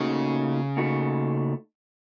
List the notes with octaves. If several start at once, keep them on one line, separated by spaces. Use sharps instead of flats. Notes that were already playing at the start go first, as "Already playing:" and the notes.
Already playing: A#2 C#3 A3 D#4 F#4
A#2 A3 D#4 F#4